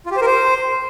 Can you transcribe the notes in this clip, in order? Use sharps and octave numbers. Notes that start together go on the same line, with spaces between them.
F4
G4
C5
A#4
C5